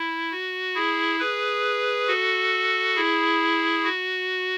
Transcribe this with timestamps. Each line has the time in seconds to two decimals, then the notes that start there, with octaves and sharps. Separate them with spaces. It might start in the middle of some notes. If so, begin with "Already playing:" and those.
Already playing: E4
0.31 F#4
0.75 E4 G#4
1.20 G#4 B4
2.08 F#4 A4
2.95 E4 G#4
3.84 F#4